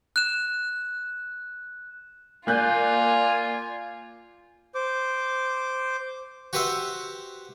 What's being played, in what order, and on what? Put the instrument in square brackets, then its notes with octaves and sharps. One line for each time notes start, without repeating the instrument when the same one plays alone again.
[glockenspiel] F#6 E7
[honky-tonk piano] A#3 F#6 G6 [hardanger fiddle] F4 [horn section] D5 G#5
[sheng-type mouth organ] C5 D6
[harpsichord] F#4 G4 B4 C5 E5 F#5